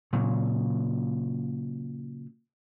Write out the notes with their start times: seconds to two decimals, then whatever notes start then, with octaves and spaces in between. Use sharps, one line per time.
0.13 A#2 C#3 F#3